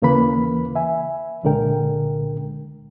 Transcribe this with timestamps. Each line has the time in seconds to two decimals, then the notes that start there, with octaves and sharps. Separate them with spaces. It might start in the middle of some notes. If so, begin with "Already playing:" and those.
0.02 D#2 C#3 E3 A#3 B4 B5
0.75 E5 G#5
1.43 C2 A#2 D3 G#3 A#4 G5